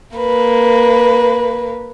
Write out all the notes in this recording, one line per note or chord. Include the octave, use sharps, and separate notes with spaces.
A#3 B4